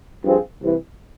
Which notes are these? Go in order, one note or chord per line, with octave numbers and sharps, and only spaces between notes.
G2 F3 C4 F4 G#4
C2 C3 E3